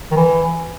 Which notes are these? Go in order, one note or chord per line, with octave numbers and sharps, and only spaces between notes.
D#3
E3